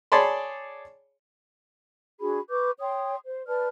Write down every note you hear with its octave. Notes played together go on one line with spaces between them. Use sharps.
G#4 C#5 D5 A5 B5 C6
D4 F#4 G#4 B5
B4 C#6 D6 G6
C#5 G5 C6 D#6
C5
B4 D5 A5 F6